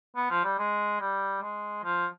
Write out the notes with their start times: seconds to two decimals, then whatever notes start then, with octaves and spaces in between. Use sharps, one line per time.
0.16 B3
0.30 F3
0.44 G3
0.59 G#3
1.01 G3
1.42 G#3
1.84 F3